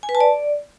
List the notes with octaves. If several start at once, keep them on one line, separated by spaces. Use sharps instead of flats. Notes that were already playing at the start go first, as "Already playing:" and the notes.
G#5
B4
A5
D5